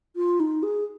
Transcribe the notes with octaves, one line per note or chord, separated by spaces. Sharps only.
F4
D#4
G#4